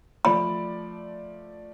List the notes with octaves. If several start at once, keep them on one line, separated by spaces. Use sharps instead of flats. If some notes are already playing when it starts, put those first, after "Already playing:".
F3 A3 D5 B5